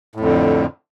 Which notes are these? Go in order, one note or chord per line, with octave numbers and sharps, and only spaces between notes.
F2 A2 D3